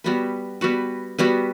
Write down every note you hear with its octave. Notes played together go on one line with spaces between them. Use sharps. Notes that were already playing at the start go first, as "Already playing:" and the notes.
G3 B3 F#4 B4
G3 B3 F#4 B4
G3 B3 F#4 B4